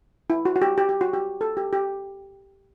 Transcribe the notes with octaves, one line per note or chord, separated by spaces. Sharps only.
E4
F#4
F#4
G4
G4
G4
F#4
G4
A4
G4
G4